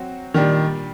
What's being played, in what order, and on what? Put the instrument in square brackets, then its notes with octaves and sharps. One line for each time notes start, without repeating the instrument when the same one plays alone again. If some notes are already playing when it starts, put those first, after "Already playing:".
Already playing: [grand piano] F#3 C4 F#4
[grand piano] A#2 G3 D4 G4 [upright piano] D#3